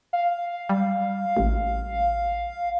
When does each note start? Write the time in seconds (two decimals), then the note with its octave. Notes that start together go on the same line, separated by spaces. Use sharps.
0.13 F5
0.69 G3
1.37 A1